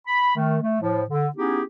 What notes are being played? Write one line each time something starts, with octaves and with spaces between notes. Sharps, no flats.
B5
D#3 A3
A3
A2 F3
D3
B3 C#4 D#4 E4 G4 G#4